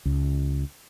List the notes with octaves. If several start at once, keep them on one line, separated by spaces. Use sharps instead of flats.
C#2